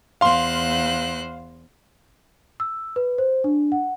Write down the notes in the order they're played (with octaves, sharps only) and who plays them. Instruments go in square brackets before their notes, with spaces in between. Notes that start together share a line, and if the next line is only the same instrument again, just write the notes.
[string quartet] E2 C5 F#6 [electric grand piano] F5 C6
[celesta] E6
B4
C5
D4
F#5